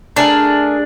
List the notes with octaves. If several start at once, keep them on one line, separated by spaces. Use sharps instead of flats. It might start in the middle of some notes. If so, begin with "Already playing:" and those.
A3 D4 G#4 A#4